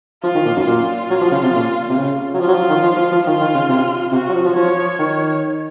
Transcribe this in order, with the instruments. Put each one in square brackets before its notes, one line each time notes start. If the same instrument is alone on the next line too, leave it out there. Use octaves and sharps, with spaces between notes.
[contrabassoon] F3 [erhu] F4
[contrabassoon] D#3
A#2
F#2
[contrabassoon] A#2 [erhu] F4
[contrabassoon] F#3
F3
C#3
C3
A#2
C3
C#3
F#3
[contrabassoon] F3 [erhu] F4
[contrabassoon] F#3
F3
D#3
F3
F3
F3
[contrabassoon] D#3 [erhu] F4
[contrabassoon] D#3
C#3
C3
[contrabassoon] C3 [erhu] F#4
[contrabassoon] F#3
F3
F3
[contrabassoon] F3 [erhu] C#5
[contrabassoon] D#3